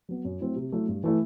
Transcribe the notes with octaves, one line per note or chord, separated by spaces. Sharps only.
F#3 B3
F#2
F#3 A3 C4 E4
C3
F#3 A3 E4
G2
E3 A3 E4